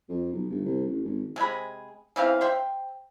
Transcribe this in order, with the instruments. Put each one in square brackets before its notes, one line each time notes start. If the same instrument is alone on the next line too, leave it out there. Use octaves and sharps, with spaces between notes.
[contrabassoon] F2
B1
G1
C2
A1
G#1
[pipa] C3 G#3 G#4 B5
C#3 E3 C4 F5
C5 E5 G5